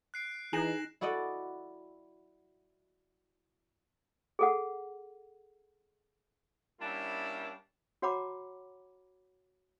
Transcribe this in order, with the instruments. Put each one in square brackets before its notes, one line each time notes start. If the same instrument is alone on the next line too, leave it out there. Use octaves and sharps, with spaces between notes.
[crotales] F#6 C7 D7
[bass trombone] E3 [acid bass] D#4 [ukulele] G#4 [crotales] A#6 E7 F#7
[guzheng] E4 F#4 A4 D5 D#5 F#5
[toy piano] G#4 A4 F#5
[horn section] G3 A#3 C#4 D4 E4
[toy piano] F#4 C#5 F#5 A#5 B5 D6